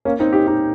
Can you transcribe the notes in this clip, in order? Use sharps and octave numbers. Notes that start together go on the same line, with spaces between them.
A#3 C#4
C4 D#4
D#4 G4
D#4 G4